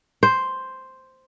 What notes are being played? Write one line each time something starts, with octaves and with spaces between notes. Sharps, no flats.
C5